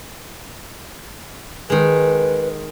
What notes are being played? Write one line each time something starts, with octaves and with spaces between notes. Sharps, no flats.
D#3 G#3 B4